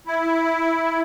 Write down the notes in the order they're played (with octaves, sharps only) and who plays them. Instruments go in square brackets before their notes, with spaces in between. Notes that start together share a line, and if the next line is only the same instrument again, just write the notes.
[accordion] E4